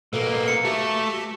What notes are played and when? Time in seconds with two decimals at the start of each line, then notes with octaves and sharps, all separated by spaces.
0.13 B2 A#3 A4 B4
0.48 C#7
0.65 A3 F#4 G4 A5